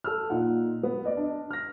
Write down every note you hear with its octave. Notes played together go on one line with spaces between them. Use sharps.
A4 E6 F6
A#2 D#4 F4 F#5
B3
D5 D#5
D4
F6 A#6